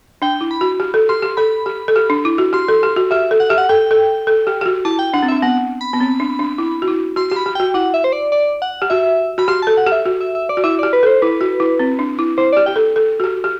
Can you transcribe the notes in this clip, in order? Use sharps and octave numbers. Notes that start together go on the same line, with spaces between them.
D4 G5
E4
B5
F#4
G4
A4
G4 C6
G4
A4 B5
G4
A4
G4
D4
E4
F#4
G4 C6
A4
G4
F#4
G4 E5
A4
F#5
G4 E5
F#5
A4 G5
A4
A4
G4
G4
F#4
E4 A5
G5
D4 F#5
C4
D4 E5
B3 F#5
B5
B3
C4
D4
D4
E4
F#4
E4
F#4 C6
G4 C6
B5
G4
F#4 G5
E4 F#5
E5
C5
D5
D5
F#5
G4
F#4 E5
F#4 B5
G4 C6
A4 A5
F#5
G4
E5
F#4
E5
E5
D5
F#4
E4 E5
G4 D5
B4
A4
C5
E4 B4
F#4
E4
C4
D4
E4
E4 C5
G4 D5
G4 G5
A4
A4
F#4
G4
G4